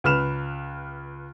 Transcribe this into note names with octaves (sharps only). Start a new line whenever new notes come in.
C#2 B4 F6 E7